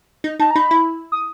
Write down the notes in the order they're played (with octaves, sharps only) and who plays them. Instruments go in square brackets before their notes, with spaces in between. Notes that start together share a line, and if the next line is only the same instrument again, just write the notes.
[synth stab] D#4
[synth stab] D#4 [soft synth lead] A5
[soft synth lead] A#5
[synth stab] D#4 [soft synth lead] B5
[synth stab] E4
[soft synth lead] D#6